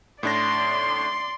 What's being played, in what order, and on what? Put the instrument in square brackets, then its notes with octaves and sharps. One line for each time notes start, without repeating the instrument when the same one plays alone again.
[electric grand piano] A2 D4 A#6 [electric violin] D5 C6